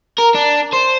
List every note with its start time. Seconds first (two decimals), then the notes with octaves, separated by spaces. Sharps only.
0.19 A#4
0.35 D4
0.73 C5